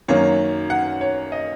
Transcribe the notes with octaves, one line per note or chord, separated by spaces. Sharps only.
F#2 D#3 F#3 A#3 C#4 C#5
F#5
C#5
D#5